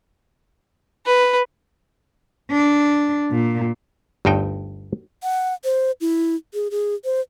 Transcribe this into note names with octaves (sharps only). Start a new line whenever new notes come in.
B4
D4
A#2
G1 D2 G2 D#4 G5
F#5
C5
E4
G#4
G#4
C5